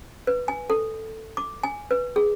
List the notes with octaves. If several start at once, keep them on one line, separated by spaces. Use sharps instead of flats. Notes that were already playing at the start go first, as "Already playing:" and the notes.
B4
G#5
A4
D6
G#5
B4
G#4